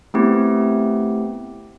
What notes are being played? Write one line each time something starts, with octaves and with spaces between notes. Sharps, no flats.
A3 B3 C4 E4 G4